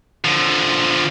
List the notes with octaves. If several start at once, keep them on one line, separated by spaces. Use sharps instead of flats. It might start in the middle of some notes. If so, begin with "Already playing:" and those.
D3 F3